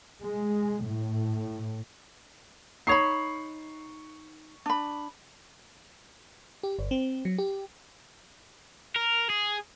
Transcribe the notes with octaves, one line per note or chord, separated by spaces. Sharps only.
G#3
A2
D#4 C#5 B5 C#6 C7
D4 B5
G4
G1
C4
F#3
G4
A#4
G#4